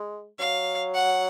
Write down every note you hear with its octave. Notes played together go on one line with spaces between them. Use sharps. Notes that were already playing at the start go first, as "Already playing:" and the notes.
Already playing: G#3
F#3 F5
F#5